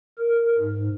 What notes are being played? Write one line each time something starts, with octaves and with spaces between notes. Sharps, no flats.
A#4
G#2